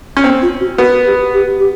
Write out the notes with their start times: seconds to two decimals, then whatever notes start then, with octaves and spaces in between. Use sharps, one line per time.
0.17 C#4
0.24 B3 C4
0.42 F4
0.60 F#4
0.78 B3 F#4
1.05 G4
1.33 G4
1.59 G4